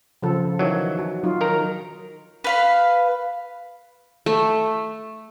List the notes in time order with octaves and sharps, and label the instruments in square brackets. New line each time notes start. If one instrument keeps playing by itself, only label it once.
[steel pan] C#3 F3 A4
[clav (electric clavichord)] D#3 E3 F#3
[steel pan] F#4
F#3 D#4 F4
[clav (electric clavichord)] D#3 A#4 A#5
[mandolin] B4 F5 B5
[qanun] A3